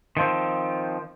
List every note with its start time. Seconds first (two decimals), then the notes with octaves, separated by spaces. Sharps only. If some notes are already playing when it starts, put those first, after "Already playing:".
0.17 D#3 F3 C4